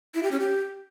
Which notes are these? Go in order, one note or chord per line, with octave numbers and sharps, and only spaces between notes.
E4
G4
C#4
G4